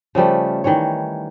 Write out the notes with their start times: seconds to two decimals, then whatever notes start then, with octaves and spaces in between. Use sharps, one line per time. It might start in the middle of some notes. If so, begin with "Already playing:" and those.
0.15 C#3 F3 G3 A3
0.64 D#3 E3 G3 C#5